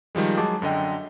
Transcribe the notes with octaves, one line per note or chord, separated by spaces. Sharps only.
D#3 F3 G3 G#3
F#3 G#3 A5 D6
F#2 D3 D#5 G5